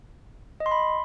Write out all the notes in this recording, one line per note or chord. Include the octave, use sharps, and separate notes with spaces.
D#5
C6
B5